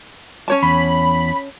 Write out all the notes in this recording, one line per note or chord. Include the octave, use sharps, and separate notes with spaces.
C#4 C#5 A5
E2 B5